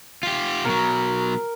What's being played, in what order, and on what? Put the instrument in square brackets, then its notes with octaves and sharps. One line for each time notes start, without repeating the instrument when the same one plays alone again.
[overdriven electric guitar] F4 G4
[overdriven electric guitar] B2 F#3 [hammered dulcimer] A#4